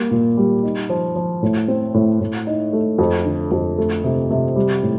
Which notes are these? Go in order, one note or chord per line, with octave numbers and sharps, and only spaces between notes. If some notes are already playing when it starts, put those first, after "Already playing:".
Already playing: G3 A#3
A#2
G3
D#4
F3
F3
A2
C4
A2
A2
D#4
A3
F2
D3
F2
A3
C3
C3
G3
A2